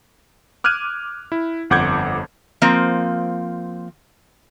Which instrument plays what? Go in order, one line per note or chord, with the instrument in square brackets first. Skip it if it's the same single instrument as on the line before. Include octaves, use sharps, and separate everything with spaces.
[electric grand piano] D6 F6 F#6 G#6 D#7
E4
G1 F2 F#5 D6 G6 G#6
[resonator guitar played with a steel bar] F3 A#3 C4